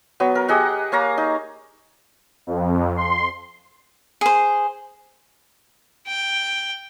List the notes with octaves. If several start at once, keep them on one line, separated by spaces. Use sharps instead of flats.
F#3 B3
A#4
G4 G#4 D#5 F#5
A#3 C#5 F5 A#5
D#4
F2
C6
G#4 C5
G5